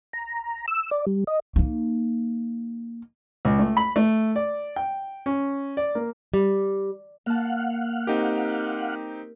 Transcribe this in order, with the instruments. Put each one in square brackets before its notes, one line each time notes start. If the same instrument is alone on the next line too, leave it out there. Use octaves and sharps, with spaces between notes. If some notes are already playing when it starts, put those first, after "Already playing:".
[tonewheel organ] A#5
E6
D5
G3
D#5
[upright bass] A#3 D#4
[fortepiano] C#2
A3
B5
A3
D5
G5
C#4
D5
A#3
[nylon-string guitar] G3
[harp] A#3 A5 [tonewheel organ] F5 F#5
[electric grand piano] C4 D#4 G4 [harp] A#4